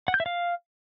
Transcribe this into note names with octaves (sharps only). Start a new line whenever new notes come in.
F#5
G6
E5
F5